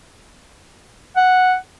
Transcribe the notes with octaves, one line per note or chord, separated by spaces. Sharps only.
F#5